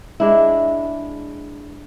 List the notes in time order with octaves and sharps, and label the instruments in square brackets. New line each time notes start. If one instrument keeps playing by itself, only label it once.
[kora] G#3 D4 E4